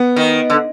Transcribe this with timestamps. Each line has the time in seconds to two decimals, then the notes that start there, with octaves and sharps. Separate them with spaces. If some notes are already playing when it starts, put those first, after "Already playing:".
Already playing: B3
0.16 D#3
0.50 D3